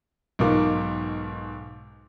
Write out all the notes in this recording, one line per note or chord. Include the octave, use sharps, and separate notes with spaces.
B1 G#2 B2 F4 A#4 D6